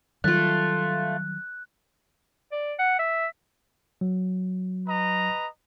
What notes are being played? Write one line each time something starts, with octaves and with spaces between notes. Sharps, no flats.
D#3 F#3 G3 A3 F4 F#6
D5
F#5
E5
F#3
B4 D#5 A#5